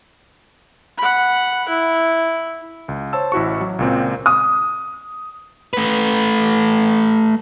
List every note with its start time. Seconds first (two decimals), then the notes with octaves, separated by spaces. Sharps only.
0.98 F#5 B5
1.69 E4
2.88 C#2
3.13 C5 C#5 A5 E6
3.32 A1 E4 F#4 C#6
3.61 F#3
3.79 C#2 A#2 C4
4.26 D#6
5.74 A3 B4